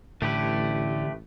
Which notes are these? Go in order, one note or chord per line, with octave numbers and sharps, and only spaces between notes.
A1 A2 D3 A3 G4 B4